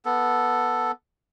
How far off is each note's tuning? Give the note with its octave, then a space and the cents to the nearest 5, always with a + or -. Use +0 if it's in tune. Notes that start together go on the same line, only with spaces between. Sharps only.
B3 -10 A4 +0